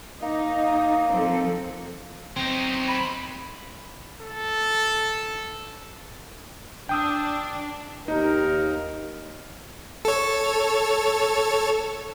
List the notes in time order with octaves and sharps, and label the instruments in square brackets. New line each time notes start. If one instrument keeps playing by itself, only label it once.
[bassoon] A#3 [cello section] D#4
[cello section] F3 C4 A4
[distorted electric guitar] F#3 D#4 [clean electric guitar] C4
[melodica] B5
[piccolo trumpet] A4
[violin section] D4 [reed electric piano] G5 D#6 E6
[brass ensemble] D#2 A#4 [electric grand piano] D#4
[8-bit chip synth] A4 C#5